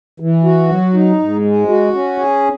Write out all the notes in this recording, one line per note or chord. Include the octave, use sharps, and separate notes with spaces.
E3
F#4
F#3
D#4
G#2
G#3
F#4
C#4
G#4